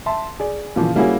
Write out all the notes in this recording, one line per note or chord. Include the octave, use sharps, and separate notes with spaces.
E5 A5 C6
G#4 D5
A#2 C#3 E3 F3
G3 A#3 C#4 E4 F#4 G#4